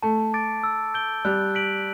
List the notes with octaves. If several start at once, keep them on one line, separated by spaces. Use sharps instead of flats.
A3 A5
D6 A6 D7
E6
G6 D7 G7
G3 F#6
B6 D7 F#7